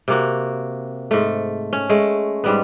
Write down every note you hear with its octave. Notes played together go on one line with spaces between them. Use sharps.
C3 A#3 F#4
G#2 A3
C#4
G#3 A3
G#2 G3 B3